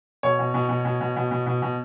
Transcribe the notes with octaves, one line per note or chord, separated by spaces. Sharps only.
B2 C#5
B2
B2
B2
B2
B2
B2
B2
B2
B2